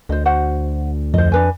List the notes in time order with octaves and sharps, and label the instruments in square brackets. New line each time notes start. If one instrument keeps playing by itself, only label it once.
[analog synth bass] D2 [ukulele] C5 D#5
[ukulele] F#4 C5 F#5
[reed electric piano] F2 [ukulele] C5 D#5
[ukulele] D4 B4 G#5